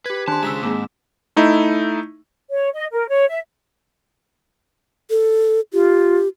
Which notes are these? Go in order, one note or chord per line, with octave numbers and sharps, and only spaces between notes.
G4 B4 G#6 B6
D#3 D4 C5 G#5 A5 C6 F#6
C#3 G#3 A5 A#5 E6 B6 E7
G#2 A#3 C4 G#4 D6
A3 D#4 E4
C#5
D#5
A#4
C#5
E5
A4
F4 G4